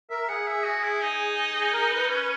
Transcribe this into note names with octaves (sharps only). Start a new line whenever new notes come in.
A#4 E5
G#4 F#5
E5
F#4
E4
D#4
G#4
A#4
B4
C#4 B4